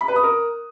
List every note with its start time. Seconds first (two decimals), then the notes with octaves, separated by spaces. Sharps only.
0.01 B5
0.08 B4
0.16 D#6
0.23 A#4